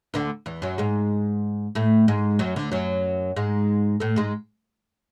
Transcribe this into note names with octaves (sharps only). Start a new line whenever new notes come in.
D2 D3
E2 E3
F#2 F#3
G#2 G#3
A2 A3
G#2 G#3
F#2 F#3
D2 D3
F#2 F#3
G#2 G#3
A2 A3
G#2 G#3